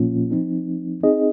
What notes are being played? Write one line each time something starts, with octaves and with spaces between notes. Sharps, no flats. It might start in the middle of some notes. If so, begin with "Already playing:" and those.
Already playing: A#2 F3 A#3 C#4 F4
F3 C4 D#4
C4 D#4 G#4 D#5